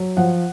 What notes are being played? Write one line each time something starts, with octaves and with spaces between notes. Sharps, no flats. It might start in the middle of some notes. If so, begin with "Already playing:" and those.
Already playing: F#3
F3 F#5